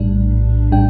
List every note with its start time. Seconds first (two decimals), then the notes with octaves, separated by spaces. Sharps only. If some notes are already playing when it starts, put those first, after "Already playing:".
Already playing: A#1 A2 G3 D4
0.71 A2 G3 D4 G5